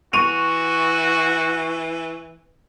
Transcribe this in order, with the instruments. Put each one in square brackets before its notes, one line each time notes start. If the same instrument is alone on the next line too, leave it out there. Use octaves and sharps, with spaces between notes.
[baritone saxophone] E3 [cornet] F#4 [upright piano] C#6 D#7 F7